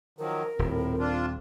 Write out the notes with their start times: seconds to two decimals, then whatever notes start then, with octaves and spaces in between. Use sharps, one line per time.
0.18 D#3 F3 F#3 A#4
0.59 D#1 A2 C4
0.99 D4 F4